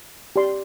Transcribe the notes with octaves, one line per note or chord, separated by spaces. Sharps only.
G4 D5 C6